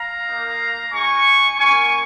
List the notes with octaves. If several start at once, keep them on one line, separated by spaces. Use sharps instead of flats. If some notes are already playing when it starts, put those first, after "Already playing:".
Already playing: F5 A#5
A#3 D#4
G#3 D#4 G#5 C#6
A#3 C#4 F4 G#5 C#6